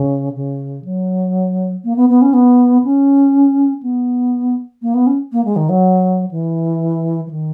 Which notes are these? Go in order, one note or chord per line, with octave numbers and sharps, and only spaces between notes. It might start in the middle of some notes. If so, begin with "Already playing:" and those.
Already playing: C#3
C#3
F#3
A#3
B3
B3
C#4
B3
C#4
B3
A#3
B3
C#4
A#3
G#3
D#3
F#3
E3
E3
D#3